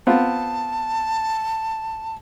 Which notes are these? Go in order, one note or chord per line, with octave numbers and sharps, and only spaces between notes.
B3 C4 F4 A5